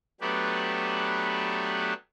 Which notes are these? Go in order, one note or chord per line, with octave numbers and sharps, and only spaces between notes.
F#3 A3 B3 D4 G4 B4